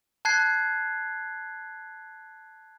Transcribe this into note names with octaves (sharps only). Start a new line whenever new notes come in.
A5 F#6 G#6 C7